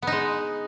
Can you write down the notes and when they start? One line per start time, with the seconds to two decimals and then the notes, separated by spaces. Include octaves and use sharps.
0.02 B3
0.07 D#4
0.12 G#3